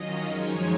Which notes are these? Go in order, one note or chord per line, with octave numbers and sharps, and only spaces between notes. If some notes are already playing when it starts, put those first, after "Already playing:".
Already playing: D#3 F#3 C#4 F4 D#5
F#2 F3 G#3 D#4 C#5